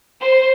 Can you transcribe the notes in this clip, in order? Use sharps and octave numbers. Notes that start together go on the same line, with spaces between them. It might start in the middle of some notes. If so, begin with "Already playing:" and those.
C5